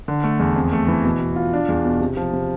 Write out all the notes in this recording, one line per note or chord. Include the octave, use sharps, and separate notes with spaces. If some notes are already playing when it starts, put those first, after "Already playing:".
D3
A3
E2
F2
A3
E3
B2
B2
F4
D4
E2
B2
C3
F3
C3